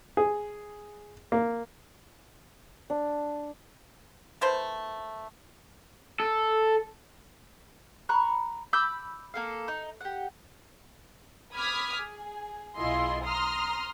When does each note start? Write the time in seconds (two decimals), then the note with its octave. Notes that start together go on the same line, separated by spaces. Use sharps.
0.17 G#4
1.32 A#3
2.90 D4
4.41 D#3 A3 B4 C5
6.20 A4
8.09 A#5 B5 C#6 F#6
8.73 B5 D6 E6 G6
9.34 A#3 A4 F5
9.68 D#4
10.01 G4 F#5
11.54 B5 D6 D#6 F6 G#6 B6
11.99 G#4
12.76 B1 E4 F4 G#4 D#5 C6
13.24 A#5 C6 D#6 F6